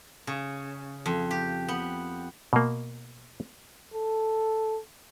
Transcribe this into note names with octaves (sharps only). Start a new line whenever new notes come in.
C#3
F2
G4
B3
B2 A#3
A4